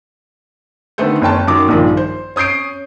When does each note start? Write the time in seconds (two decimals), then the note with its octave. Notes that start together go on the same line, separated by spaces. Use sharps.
0.98 D3 D#3 A3 B3 A4 C5
1.22 F#1 C#4 G5 A5
1.47 F#2 D#3 F#3 D6
1.68 A#1 G2 D#3 F3
1.97 C5
2.36 C#4 D#6 G6 C7 D7